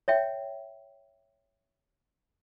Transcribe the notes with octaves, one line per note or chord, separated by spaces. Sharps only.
C#5 E5 G5